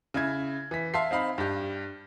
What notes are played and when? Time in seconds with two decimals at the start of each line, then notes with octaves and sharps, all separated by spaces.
0.14 C#3 E4 G#6
0.71 E3 B6
0.94 E5 F5 A5 C6 B6 C7
1.11 C4 D#4 F5 B5
1.38 G2 G4